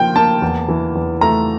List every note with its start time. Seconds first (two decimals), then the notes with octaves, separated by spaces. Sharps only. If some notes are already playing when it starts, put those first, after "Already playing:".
Already playing: F3 A#3 G5
0.16 A#3 A5
0.42 E2
0.68 E3
0.95 E2
1.21 A3 A#5